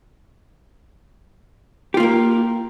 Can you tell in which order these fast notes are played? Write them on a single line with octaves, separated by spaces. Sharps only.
G4 F4 A#3 A#4